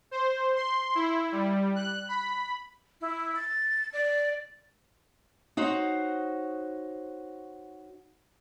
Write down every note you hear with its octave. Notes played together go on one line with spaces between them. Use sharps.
C5
C6
E4
G3
F#6
B5
E4
A6
D5
D#4 F#4 C5 C#5